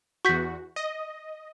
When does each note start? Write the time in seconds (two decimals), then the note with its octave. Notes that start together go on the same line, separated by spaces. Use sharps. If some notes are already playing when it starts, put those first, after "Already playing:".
0.25 E2 F#4 C#6 G6 B6
0.76 D#5